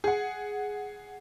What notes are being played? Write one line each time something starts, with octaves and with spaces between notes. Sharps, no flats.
G#4 F#5